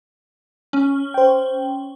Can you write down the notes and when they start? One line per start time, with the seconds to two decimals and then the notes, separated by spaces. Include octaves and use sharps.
0.73 C#4
1.14 C5 G5